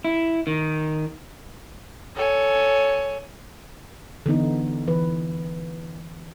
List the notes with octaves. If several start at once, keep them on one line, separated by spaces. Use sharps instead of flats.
E4
D#3
A4 C#5 G#5
D3 E3 B3 D#4
E3 B4